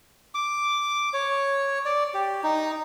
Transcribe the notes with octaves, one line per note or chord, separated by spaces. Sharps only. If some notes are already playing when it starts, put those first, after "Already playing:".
D6
C#5
D5
G4
D#4